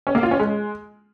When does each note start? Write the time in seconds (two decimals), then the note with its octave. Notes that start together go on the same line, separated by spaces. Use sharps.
0.07 C#4
0.15 A#3
0.23 F4
0.31 C#4
0.39 G#3